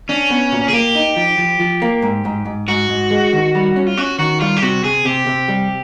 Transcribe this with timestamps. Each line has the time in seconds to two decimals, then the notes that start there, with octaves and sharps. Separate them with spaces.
0.09 C#4 D4
0.30 B3
0.52 A#2
0.68 G#4
0.73 A#3 G4
0.95 D#4
1.16 F3
1.38 F3
1.60 F3
1.82 A#3
2.02 G#2
2.25 G#2
2.46 G#2
2.68 G#2 F#4
2.89 G#2
3.11 G#3
3.33 D#3
3.55 G3
3.76 C#4
3.87 F4
3.97 C#4 F#4
4.18 D#3 F#4
4.41 G3 F4
4.57 G4
4.62 C3 F#4
4.84 C3 G#4
5.05 C3 G4
5.27 C3
5.48 G3